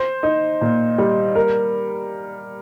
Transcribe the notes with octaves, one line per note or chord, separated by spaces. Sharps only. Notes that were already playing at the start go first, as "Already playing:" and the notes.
Already playing: C5
D#4
A#2
G3
A#4